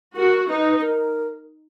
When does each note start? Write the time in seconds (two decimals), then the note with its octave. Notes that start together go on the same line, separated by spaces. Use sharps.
0.16 F#4 A#4
0.49 D#4 B4
0.81 A#4